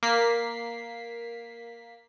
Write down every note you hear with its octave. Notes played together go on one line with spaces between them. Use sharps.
A#3 B6 C7